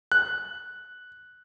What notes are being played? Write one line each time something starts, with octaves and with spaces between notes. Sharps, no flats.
F#6